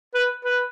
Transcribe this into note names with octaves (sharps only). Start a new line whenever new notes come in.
B4
B4